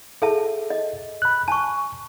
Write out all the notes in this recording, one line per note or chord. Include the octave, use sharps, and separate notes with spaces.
G#4 A4 E5 A5
D#5
B5 F#6
G#5 A5 C#6